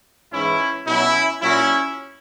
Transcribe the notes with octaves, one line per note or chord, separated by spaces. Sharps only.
G#2 E3 C#4 E4
B2 F#3 C#4 E4
A#2 F#3 C#4 E4